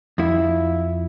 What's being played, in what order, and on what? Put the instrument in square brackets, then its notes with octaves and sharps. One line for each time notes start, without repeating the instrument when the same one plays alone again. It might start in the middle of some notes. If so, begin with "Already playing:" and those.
[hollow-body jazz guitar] F2 E4